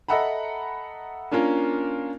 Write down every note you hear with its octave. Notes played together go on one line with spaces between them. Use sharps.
A4 D#5 E5 F#5 A#5 B5
A#3 C#4 D4 F4 A#4